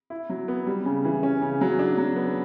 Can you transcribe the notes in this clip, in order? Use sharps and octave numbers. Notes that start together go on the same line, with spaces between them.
E4
F#3
B3
G3
C#3
E3
C#4
C#3
F#3
D4
F#3
B3